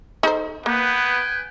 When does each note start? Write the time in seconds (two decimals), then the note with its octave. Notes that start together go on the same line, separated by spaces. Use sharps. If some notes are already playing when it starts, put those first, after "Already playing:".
0.23 D#4 A4 C5
0.66 A#3 B3 B4 G5 G#5